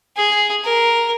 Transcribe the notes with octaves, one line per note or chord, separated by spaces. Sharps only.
G#4
A#4